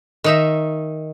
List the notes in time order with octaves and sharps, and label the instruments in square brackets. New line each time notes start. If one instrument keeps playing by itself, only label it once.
[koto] D#3 D#4 E5